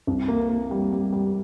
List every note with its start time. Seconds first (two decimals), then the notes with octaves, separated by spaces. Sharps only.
0.07 C2
0.28 A#3
0.49 A#3
0.71 G3
0.92 G3
1.12 G3